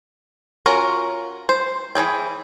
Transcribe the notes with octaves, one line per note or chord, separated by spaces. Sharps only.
C#4 F4 F#4 A#4
C5
E3 D#4 G#4 G5